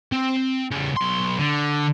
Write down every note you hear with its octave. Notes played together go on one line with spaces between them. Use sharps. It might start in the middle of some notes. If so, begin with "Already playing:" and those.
C4
C#3 G3
B1 C6
D3